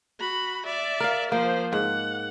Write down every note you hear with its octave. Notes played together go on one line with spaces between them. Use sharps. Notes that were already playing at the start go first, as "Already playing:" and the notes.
F#4 B5
D5 E5
A#4 F5
F3 A#3 C5
G#2 F#5